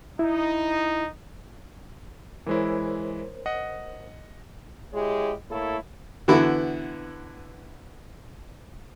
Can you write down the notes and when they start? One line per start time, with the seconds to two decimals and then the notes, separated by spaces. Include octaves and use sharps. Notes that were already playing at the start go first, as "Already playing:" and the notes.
0.19 D#4 E4
2.47 E3 G#3 E4 A#4 C5 C#5
3.46 D#5 F#5
4.93 G#3 E4 G4 G#4 C#5
5.50 A3 A#3 E4 A4 C#5
6.28 D3 E3 B3 E4 F#4